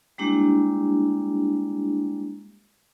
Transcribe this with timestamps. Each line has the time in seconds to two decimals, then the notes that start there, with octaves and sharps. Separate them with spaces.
0.18 G3 G#3 A#3 D4 E4 G4